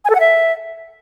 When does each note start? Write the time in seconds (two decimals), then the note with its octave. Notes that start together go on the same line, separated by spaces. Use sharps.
0.05 G#5
0.10 A4
0.15 F#5
0.20 E5